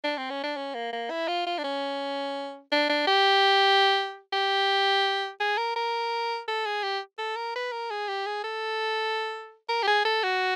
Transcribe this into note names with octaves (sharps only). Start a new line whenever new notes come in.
D4
C4
C#4
D4
C#4
A#3
A#3
E4
F4
F4
D4
C#4
D4
D4
G4
G4
G#4
A#4
A#4
A4
G#4
G4
A4
A#4
B4
A#4
G#4
G4
G#4
A4
A#4
G4
G#4
A4
F#4